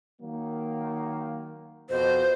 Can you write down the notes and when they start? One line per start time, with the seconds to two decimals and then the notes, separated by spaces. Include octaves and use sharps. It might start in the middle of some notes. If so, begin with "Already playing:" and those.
0.20 D#3 F#3 A#3
1.89 F2 B2 C5